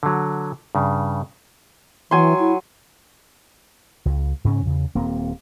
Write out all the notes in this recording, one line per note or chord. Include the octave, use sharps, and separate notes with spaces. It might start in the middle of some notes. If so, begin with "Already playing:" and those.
D3 F#3
G2 C#3
E3 F#3 G#5 C6
E4
C#2
G#2 C#3 C#4
E2 C#3
D#1 A#3 C4